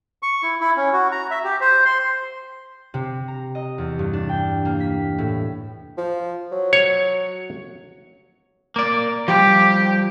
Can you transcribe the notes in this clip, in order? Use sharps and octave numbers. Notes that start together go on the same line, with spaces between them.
C#6
E4
E4
C#4
F#4
A#5
E5
G4
C5
C6
C3
A#5
D#5
E2
G2
D4
G5
A#3
B6
A2
F3
F#3
C#5
A#3 D5
F3 G3 G4